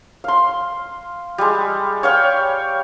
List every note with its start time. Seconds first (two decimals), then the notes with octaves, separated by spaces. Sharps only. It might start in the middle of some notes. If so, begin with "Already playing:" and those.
0.24 F5 C6
1.38 G3 G#3
2.03 C#5 F5 G5